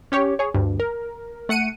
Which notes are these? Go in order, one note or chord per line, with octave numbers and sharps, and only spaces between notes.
C#4 G4 C#5
G#4 C#5
D2 G2
A#4
A3 F#5 C#7 D#7